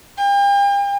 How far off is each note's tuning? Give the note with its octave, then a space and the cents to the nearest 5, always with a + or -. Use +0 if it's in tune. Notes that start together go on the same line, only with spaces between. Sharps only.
G5 +40